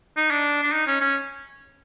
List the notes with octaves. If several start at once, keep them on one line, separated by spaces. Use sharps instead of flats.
D#4
D4
D4
D#4
C#4
C#4